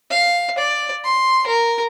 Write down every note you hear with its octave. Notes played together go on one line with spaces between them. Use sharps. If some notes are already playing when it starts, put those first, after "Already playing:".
F5
D5
C6
A#4